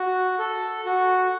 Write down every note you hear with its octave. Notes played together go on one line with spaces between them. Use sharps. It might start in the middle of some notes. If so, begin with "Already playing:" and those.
Already playing: F#4
A4
F#4